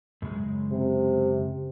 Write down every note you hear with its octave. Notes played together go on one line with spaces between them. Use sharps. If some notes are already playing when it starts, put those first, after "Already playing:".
F#2 C#3 G#3
C3